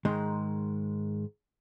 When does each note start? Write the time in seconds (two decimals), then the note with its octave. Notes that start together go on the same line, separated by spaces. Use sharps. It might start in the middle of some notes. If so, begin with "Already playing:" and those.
0.05 G#2 D#3 G#3